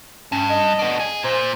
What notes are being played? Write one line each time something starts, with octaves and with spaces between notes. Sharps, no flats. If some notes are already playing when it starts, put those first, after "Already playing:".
G2 C#4
D#5
B3 D4
G#4
A#2 C5